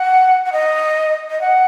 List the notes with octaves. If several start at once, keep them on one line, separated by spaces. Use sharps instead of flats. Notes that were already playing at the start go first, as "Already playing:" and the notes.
Already playing: F#5
F#5
D#5
D#5
F#5